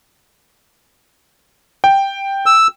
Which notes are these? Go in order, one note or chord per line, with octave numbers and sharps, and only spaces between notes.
G5
E6